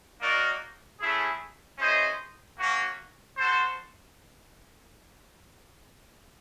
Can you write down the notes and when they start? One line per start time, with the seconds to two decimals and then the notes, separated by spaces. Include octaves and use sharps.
0.21 A#3 D#4 F#4 A#4 D5
1.00 A3 C#4 E4 G#4
1.79 C#4 E4 G#4 C5 D#5
2.58 A#3 C#4 F#4
3.37 F#4 A4 C5